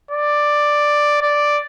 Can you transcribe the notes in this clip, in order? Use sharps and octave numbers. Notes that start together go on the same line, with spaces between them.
D5
D5